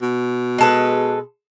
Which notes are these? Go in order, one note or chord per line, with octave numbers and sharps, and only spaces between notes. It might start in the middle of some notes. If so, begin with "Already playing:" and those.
B2
G#3 A4 B4